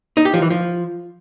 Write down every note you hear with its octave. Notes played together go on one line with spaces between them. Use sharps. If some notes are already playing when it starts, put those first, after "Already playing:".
D#4
G4
F3
E3
F3